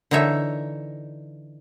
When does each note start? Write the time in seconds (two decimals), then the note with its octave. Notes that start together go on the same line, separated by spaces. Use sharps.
0.11 D3 E3 D#4 C#5 E5